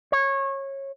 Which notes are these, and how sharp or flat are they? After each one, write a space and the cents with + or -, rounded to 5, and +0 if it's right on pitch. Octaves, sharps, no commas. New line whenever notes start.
C#5 -20